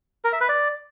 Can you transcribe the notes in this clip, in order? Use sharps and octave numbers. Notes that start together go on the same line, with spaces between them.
A#4
E5
B4
D5